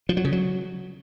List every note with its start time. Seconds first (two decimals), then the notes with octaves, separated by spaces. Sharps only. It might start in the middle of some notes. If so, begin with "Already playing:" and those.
0.09 F3
0.17 F#3
0.25 C#3
0.32 F#3